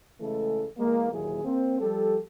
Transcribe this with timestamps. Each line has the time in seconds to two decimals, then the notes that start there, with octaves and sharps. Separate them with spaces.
0.21 C#3 E3 G#3 A3 A4
0.79 E3 G#3 A#3
1.12 D#2 A#2 E3 F#3 G#4
1.44 A#3 C4
1.80 F3 G3 G4 A4